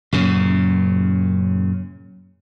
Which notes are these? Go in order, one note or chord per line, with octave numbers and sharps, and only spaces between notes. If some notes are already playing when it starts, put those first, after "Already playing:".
F#2 A#2 C#3